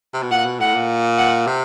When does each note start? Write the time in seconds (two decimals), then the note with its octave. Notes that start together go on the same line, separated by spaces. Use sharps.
0.13 C3
0.23 B2
0.31 A#2 F#5
0.45 B2
0.60 A2 F#5
0.74 A#2
1.18 F#5
1.47 C3